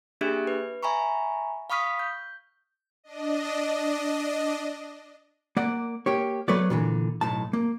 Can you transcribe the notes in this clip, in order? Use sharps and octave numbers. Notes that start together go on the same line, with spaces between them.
A#3 D4 G4 G#4 E5 F#6
B4
E5 G#5 A#5 B5 C#6
F5 B5 C#6 D#6 F6 B6
G6
D4 D#5
A#3 D5 F#5
A#3 G4 C#5
F#3 A3 B3 B4 C#5 D5
A#2 D3 E3
B1 A2 A5
A#3